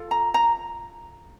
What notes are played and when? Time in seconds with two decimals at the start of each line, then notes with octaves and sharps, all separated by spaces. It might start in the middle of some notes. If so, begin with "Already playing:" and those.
Already playing: F4 A4
0.11 A#5
0.34 A#5